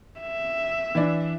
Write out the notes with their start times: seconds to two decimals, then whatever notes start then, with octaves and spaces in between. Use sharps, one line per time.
0.21 E5
0.95 E3 D4